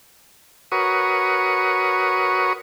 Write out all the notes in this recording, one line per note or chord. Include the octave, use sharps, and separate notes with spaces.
F#4 A#4 B4 C#5 C#6 D#6